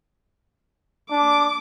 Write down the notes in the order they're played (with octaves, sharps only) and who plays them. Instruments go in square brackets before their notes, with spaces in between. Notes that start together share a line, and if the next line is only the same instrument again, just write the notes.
[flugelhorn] D4 [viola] D6